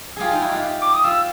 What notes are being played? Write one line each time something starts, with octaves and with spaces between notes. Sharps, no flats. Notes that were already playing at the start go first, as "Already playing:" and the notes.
F4 G4 G#4
D#4 F4
E4 F#4
F4 G4
F4 G4
D6
D#6
F4 G4 E6